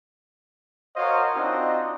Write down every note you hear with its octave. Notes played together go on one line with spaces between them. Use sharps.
F#4 A#4 C5 C#5 D#5 F5
C4 D4 D#4 F4 F#4 D#5